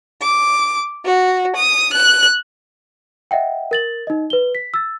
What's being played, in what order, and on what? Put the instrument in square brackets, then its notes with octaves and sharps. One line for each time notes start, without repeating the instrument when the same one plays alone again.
[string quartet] D6
F#4
D#6
F#6
[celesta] D#5 E5 F#5 G5
A#4 A6 F#7
D#4 D#5
B4 G7
B6
E6 A6